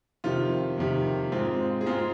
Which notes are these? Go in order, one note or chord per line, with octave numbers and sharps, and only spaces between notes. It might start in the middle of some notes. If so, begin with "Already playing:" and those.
F2 C3 D#3 F4
F2 C3 D#3
G#2 G#3 C4 F4
G#4
G#2 G#3 C4 F4